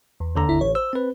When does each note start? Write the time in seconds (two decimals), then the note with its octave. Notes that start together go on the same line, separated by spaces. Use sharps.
0.20 E2
0.35 D#2 D3 A#5
0.49 G1 E4
0.61 A1 C#5
0.75 C5 E6
0.93 C4 B4